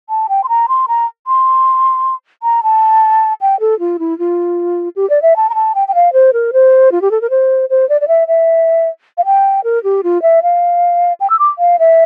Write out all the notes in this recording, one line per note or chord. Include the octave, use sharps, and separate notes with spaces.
A5
G5
C6
A#5
C6
A#5
C6
A#5
A5
G5
A4
F4
E4
F4
G4
D5
E5
A5
A#5
A5
G5
G5
F5
C5
A#4
C5
F4
G4
A4
A#4
C5
C5
D5
D5
E5
E5
F5
G5
A#4
G4
F4
E5
F5
G5
E6
D6
F5
E5